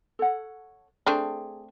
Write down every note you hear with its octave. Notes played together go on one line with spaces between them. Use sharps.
A4 C#5 F#5
A3 C4 D4 G#4